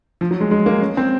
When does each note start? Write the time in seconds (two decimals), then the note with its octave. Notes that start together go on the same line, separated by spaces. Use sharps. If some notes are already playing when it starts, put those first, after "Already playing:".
0.21 F3
0.31 F#3
0.41 G#3
0.51 G#3
0.66 A#3
0.81 C#4
0.97 C4